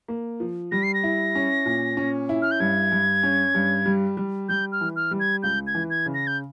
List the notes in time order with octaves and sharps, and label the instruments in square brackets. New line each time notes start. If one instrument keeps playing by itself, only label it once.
[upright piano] A#3
F3
[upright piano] G3 [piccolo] A#6
[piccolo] C7
A#6
[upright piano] E4
C#4
A#2
C#4
E4
[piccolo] F6
G6
[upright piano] G2 [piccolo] G#6
[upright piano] G2
C#4
G2
G3
G3
[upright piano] G3 [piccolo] G6
[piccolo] F6
[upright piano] E3
[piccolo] F6
[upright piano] G3
[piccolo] G#6
[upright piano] C#2 [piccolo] G6
[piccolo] G#6
[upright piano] E3
[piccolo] G#6
[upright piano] C#3
[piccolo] A#6
G6